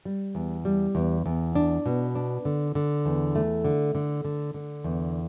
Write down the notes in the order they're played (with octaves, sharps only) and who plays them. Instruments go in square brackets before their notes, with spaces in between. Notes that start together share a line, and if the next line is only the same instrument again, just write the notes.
[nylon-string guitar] G3
E2
G3
E2
E2
D4
B2
D4
D3
D3
E2
A3
D3
D3
D3
D3
E2